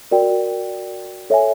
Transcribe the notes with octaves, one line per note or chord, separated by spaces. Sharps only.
F#4 A#4 D5 G5
A4 C#5 E5 G#5